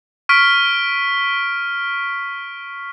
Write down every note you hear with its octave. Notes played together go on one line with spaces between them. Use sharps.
C#6 F6 B6 D7